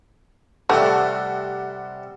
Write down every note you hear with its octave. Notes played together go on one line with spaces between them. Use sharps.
C3 G3 A3 C4 F#5